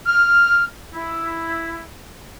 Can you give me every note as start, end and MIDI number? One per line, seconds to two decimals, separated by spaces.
0.06 0.65 89
0.93 1.83 64